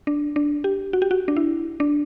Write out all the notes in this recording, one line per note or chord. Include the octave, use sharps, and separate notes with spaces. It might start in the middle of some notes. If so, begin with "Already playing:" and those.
D4
D4
G4
F#4
G4
F#4
D4
E4
D4